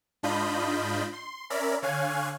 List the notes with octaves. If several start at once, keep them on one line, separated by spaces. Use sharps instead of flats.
G#2 D4 F4 D#5 B5 G6
C6
C#4 A#4 D5 E5 A#5 B5
D3 C#5 F5 G#5 F#6 G#6